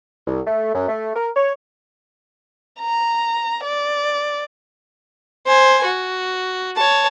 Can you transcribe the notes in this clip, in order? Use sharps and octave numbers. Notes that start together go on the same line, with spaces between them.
C2
A3
F#2
A3
A#4
C#5
A#5
D5
C5 G#5
F#4
C#5 A5